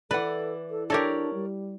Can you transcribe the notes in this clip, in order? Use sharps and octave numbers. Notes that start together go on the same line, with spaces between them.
E3 A4 B4 D5 F#5
A4
D4 G4 A4 A#4 C#5 D5
G3